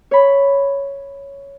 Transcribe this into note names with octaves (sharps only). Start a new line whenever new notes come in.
C#5 B5